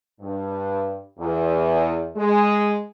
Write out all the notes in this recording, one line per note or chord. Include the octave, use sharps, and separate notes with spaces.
G2
E2
G#3